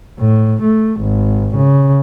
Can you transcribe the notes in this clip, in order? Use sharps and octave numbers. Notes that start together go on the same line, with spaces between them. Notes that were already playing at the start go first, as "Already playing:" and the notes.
A2
A3
G#1
C#3